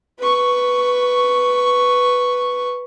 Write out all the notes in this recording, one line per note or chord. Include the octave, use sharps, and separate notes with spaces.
B4 C#6